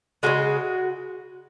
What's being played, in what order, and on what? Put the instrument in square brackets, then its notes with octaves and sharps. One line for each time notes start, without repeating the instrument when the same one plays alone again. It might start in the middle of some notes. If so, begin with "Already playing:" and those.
[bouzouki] C#3 F3 G#3 F#4